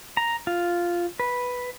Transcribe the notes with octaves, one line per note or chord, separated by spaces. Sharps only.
A#5
F4
B4